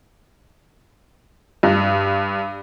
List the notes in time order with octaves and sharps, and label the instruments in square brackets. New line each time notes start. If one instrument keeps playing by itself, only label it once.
[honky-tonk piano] G2